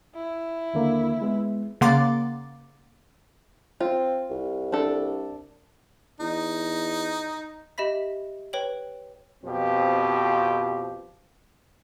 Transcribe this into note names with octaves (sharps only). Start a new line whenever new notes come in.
E4
D#2 D3 A#3
G#3 B3
C#3 A#3 F#5 C6 D6 A6
C4 F4
C2
D4 A4
E2 D#4
G4 D#5 E5 B5 B6
B4 C#5 G5 F#7
F2 B2 F3 C4 G4